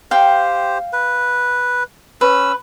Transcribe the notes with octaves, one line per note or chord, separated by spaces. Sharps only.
G4 C5 F5 G5
B4
C#4 B4 E6